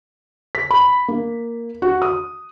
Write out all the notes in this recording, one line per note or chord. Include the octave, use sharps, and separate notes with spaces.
B6
B5
A#3
F#4
D#6